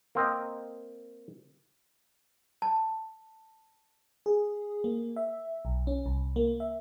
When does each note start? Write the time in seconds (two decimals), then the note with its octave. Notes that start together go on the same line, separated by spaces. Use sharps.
0.15 A#3 C4 D#5
2.62 A5
4.26 G#4
4.84 A#3
5.16 E5
5.65 B1
5.87 C#4
6.06 C2
6.36 A#3
6.60 E5